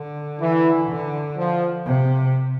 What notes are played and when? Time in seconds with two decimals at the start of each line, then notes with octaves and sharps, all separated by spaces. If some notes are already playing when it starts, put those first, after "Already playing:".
Already playing: D3
0.41 E3
0.89 D3
1.37 F3
1.86 C3